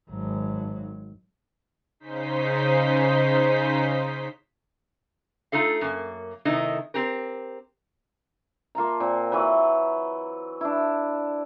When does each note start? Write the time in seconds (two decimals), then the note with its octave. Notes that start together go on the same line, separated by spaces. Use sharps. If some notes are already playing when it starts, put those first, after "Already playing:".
0.11 G#1 F#3
2.00 C#3 D#4 C5 B6
5.52 A3 D#4 F4 A4 F5
5.81 F#2 A#3
6.45 C3 D#3 A3 D#4 E4
6.94 C4 G4 A#4
8.75 A#3 F4 A5 A#5
9.00 A#2 C4
9.32 E3 F#3 B4
10.61 D4 E4